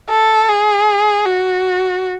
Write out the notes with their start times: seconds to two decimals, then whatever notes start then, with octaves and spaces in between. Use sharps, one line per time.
0.10 A4
0.49 G#4
1.26 F#4